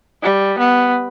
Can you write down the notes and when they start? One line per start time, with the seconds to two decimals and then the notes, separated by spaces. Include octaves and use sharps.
0.23 G3
0.59 B3